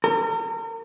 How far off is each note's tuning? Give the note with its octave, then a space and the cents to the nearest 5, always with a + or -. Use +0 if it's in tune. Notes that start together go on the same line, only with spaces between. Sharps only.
A#4 -40